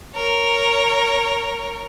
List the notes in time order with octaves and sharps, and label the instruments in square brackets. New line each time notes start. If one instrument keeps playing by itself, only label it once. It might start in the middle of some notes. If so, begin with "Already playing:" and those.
[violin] A#4 C#5